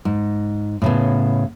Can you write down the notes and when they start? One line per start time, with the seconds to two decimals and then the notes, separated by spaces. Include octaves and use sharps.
0.05 G#2
0.82 A2 C#3 B3